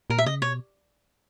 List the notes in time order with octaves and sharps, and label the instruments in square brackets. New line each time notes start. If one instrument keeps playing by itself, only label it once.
[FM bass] A#2 [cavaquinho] A#4
[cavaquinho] E5
[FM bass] C#3 [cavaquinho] D#5
[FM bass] B2 [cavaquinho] C#5